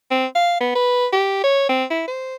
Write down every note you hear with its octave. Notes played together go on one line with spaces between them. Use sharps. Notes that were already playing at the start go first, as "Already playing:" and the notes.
C4
F5
B3
B4
G4
C#5
C4
E4
C5